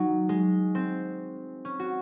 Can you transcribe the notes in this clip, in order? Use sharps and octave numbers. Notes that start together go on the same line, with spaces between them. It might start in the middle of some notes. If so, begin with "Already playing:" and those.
Already playing: F#3 D#4
G#3
C4
C#4
F#4